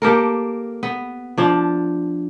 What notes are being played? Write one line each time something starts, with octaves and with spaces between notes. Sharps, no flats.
A#3 G4 A4 A#4
B3
F3 D4